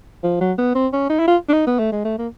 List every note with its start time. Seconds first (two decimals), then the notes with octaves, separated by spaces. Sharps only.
0.24 F3
0.41 F#3
0.58 B3
0.75 C4
0.93 C#4
1.10 D#4
1.19 E4
1.28 F4
1.49 D4
1.53 D#4
1.67 B3
1.79 A3
1.92 G#3
2.05 A3
2.18 A#3